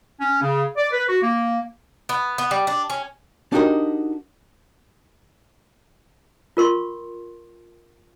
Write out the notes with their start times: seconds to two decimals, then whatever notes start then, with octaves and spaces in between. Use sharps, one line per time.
0.20 C#4
0.42 C#3
0.77 D5
0.92 B4
1.09 F#4
1.23 A#3
2.09 B3
2.38 B3
2.51 G3
2.67 D4
2.90 C#4
3.52 D4 D#4 F#4 G4 A#4 D#5
6.57 F4 A#4 C6 C#6